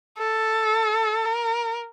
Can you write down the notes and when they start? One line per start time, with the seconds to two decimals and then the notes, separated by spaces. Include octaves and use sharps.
0.18 A4
1.25 A#4